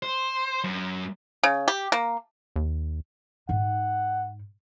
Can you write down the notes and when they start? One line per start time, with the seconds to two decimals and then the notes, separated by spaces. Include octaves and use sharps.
0.03 C5
0.64 F#2
1.43 C#3
1.68 G4
1.92 A#3
2.56 D#2
3.49 G#2 D#4 F#5